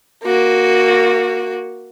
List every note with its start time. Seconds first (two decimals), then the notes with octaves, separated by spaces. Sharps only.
0.24 A#3 F#4